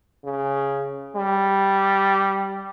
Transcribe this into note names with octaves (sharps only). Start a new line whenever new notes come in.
C#3
G3